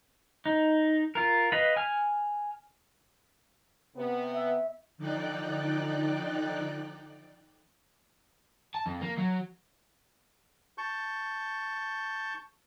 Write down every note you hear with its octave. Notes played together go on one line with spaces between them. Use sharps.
D#4
F4 A#4
B4 D#5 F5 B5
G#5 F6
C3 B3
E5
D3 F3 D#4 D5 G5 F#6
A5
F2
A#3
F#3
A5 C#6 G6